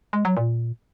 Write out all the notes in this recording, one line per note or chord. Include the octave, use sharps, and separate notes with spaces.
G#3
F#3
A#2